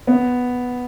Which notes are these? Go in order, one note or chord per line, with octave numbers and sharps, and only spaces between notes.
B3